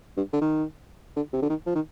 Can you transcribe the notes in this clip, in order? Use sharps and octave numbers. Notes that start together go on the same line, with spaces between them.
G2
D3
D#3
D3
C3
D3
D#3
F3
D#3